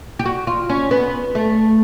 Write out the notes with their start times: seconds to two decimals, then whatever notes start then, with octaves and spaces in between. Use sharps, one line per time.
0.19 G4
0.26 F#4
0.47 F4
0.69 C#4
0.91 B3
1.35 A3